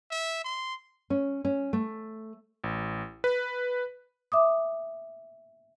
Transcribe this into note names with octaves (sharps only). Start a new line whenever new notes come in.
E5
C6
C#4
C#4
A3
A1
B4
E5 D6 D#6